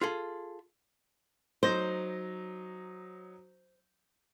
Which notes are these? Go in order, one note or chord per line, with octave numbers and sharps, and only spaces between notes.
F4 G#4 A4
F#3 D#4 C5 A#6